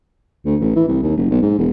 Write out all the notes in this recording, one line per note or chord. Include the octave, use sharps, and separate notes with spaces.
D2
A1
E3
C2
D#2
F#1
B1
G#2
E1